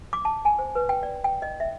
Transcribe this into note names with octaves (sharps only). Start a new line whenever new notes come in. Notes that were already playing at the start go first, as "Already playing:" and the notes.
D6
A5
G#5
C5
B4
G5
D5
G5
D#5
E5